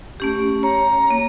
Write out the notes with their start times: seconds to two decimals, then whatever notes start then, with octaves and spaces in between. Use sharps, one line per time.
0.20 A3 C#4 G4
0.63 C#5 A#5
1.10 A#3